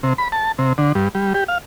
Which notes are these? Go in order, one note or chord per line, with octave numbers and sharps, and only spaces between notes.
C3
B5
A5
C3
D3
G2
G3
G4
F5